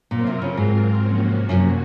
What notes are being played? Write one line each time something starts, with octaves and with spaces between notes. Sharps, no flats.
A#2 F#3 C4 F4 A#4
C3
C#3
G#2
C3 F3 A#3 C#4 F#4
F#2